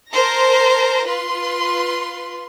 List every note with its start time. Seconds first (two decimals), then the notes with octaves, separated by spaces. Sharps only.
0.12 A#4 C5 A5 A#6
1.06 F4 B4 C6